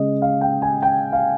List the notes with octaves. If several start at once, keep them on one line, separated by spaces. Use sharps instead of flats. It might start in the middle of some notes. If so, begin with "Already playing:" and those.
Already playing: C#3 G#3 C#4 D#5
F5
G5
G#5
G5
F5